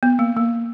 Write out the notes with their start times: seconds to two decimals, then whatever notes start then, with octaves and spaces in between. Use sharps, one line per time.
0.03 B3
0.19 A#3
0.36 A#3